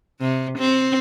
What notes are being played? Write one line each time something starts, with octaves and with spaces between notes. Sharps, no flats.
C3
C4